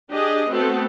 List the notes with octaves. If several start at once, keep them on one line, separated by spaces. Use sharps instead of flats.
D4 G4 G#4 D#5
A3 B3 C4 F#4 A4